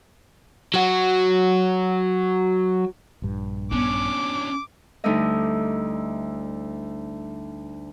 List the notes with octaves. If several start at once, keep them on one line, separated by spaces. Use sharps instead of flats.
F#3 F#4
A#1 G2
B3 C#4 D4 D6
D2 G3 A3 D#4 E4 D#5